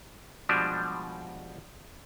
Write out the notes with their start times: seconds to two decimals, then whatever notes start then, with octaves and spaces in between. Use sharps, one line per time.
0.49 B2 F3 G3 G#3 D4